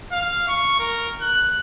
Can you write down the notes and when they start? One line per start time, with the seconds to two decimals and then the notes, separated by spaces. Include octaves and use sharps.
0.12 F5
0.48 C#6
0.80 A#4
1.21 F#6